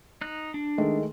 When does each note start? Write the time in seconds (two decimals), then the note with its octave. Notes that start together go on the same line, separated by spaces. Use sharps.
0.21 D#4 F#6
0.54 D4
0.78 D#3 G#3 A3